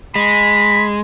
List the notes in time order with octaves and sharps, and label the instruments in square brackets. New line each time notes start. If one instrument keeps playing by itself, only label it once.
[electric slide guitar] G#3 [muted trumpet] B5